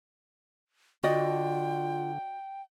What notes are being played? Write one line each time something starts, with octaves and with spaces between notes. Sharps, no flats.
D3 F4 F#4 D5 D#5 G5